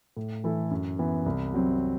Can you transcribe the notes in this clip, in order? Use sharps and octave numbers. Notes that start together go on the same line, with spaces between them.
A2
E3 A3 E4 A4
F#2
E3 B3
C2
C3 F#3 C4